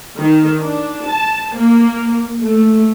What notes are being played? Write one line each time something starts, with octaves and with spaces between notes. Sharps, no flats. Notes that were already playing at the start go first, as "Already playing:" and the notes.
D#3
D4
A5
A#3
A3